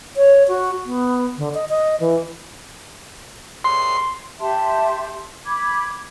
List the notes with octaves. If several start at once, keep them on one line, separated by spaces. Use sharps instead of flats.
C#5
F#4
B3
D3
D#5
D#5
E3
C6
G4 E5 A5 C6
B5 D6 G#6